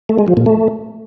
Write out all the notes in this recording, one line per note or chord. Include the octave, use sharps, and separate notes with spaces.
A3
G#3
F3
A#2
A3